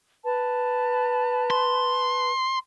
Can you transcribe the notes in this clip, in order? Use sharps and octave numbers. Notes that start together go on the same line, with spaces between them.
B4 A5
C6